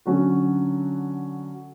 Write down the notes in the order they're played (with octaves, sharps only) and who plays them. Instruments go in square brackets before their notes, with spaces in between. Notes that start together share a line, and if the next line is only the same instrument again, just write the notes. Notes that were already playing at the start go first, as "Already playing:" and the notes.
[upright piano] D3 F#3 C#4 F#4